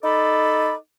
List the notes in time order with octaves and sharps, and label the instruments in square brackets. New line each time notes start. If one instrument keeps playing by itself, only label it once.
[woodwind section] D#4 A4 D5 B5